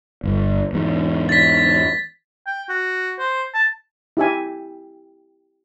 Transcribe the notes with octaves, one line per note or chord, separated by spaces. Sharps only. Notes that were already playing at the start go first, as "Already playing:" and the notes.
G1
E2 G#2
A6 B6
G5
F#4
C5
A5
E4 G4 E5 G#5